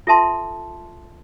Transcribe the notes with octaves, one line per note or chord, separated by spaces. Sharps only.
F4 A4 E5 A5 C6